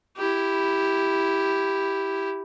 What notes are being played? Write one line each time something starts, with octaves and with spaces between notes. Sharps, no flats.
E4 G4